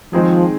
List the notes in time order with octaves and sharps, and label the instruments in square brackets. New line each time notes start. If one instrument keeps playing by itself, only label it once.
[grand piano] D#3 G#3 C4 D#4 G#4 [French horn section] F3